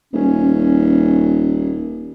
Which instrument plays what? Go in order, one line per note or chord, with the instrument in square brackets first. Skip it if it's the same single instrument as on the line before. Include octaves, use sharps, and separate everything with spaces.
[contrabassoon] D#1 [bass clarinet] C#4